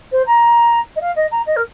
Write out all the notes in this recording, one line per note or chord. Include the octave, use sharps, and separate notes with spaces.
C5
A#5
D#5
F5
D#5
A#5
D#5
A#4